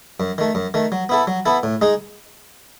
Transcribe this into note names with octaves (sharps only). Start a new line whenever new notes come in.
F#2
D#3 A3
F#2
D#3 A3
F#3
B3 E4 A4
F#3
B3 E4 A4
A2
G#3 D#4 G#4